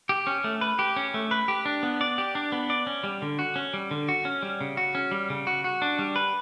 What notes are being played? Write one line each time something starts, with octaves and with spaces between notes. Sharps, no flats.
G4
C#4
A3
B4
G4
C#4
A3
B4
G4
D4
B3
D5
G4
D4
B3
D5
C#4
G3
D3
F#4
C#4
G3
D3
F#4
C#4
G3
C#3
F#4
C#4
G3
C#3
F#4
F#4
D4
G3
B4